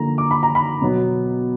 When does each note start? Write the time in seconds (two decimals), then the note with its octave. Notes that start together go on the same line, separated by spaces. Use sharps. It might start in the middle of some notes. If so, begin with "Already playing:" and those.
Already playing: D3 F3 A#3 A#5
0.18 D6
0.31 B5
0.43 A#5
0.55 B5
0.81 B2 F#3 B3